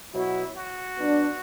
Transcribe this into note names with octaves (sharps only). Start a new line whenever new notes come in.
B2 F#3 B3 E4 F#4
F#4
F#3 B3 D4